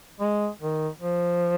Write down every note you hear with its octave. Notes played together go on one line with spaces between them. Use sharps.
G#3
D#3
F3